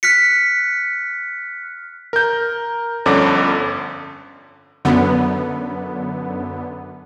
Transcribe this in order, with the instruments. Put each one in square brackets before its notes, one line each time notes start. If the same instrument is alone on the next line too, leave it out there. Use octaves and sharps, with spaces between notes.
[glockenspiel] F6 F#6 B6 C#7
[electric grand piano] A#4 G6
G1 F2 D3 C#4 D4 D6
[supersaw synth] F#2 D3 B3